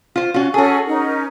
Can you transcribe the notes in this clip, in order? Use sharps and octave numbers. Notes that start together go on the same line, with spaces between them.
F4 C5
C#4 F4 F#4
C#4 F#4 G#4 A4 G#5
C#4 D#4 A#4